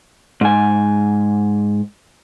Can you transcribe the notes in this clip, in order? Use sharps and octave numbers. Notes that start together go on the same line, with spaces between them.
G#2 G#5